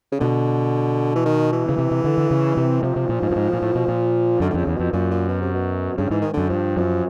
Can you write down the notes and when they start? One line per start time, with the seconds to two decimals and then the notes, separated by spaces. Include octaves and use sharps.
0.12 C#3
0.20 B2 D3
1.15 E3
1.26 D#3
1.52 E3
1.69 C#3
1.78 C3
1.91 C3
2.04 D3
2.18 D3
2.31 C#3
2.57 C3
2.83 C3 F3
2.96 C3
3.09 A#2
3.22 G#2
3.31 G2
3.36 G#2
3.53 A#2
3.62 A2
3.75 B2
3.88 A#2
4.40 F#2 D3
4.50 D3
4.54 F2 C#3
4.67 E2
4.75 F2 B2
4.93 F#2 A#2
5.11 A#2
5.28 B2
5.42 C3
5.54 B2
5.98 G2 C#3
6.10 G#2 E3
6.21 D#3
6.33 F#2 D3
6.50 G2 F3
6.76 F#2 F3